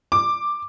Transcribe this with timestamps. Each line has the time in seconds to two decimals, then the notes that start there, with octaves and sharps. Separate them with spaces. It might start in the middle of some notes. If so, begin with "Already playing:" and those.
0.12 D6